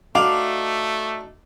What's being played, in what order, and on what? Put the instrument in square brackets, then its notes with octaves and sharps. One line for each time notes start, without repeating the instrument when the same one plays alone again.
[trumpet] A3 [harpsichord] D4 D#4 F#4 [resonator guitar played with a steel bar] F5 [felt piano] D6